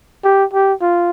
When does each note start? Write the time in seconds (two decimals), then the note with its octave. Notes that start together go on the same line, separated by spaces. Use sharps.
0.24 G4
0.53 G4
0.82 F4